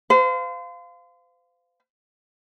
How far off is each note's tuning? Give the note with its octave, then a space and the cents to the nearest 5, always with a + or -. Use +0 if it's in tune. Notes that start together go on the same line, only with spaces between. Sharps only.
C5 -35 F5 +0